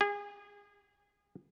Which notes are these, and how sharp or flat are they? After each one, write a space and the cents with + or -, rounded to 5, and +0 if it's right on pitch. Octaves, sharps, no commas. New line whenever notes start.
G#4 -30